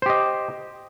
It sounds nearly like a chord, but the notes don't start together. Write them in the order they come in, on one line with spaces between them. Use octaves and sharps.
C5 G4 D#5